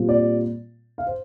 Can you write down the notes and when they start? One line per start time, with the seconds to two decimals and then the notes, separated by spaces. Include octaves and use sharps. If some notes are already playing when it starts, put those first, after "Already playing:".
Already playing: A#2 G3 C4 F4
0.09 D5
0.98 F5
1.07 C5